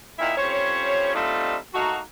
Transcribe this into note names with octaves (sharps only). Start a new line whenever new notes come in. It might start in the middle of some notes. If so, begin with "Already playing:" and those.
A#2 D#3 D#4 E4
F2 G3 C#4 C5 C#5
G3 A3 C4 D4 D#4 F4
A3 A#3 D#4 F#4